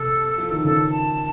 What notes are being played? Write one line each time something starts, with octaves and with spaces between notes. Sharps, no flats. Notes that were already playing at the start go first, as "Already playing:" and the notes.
Already playing: C3 A4
F3
D#3
C#3 A4
A5